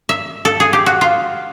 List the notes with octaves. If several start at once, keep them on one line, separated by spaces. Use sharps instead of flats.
E5
A4
G#4
G4
F#4
F4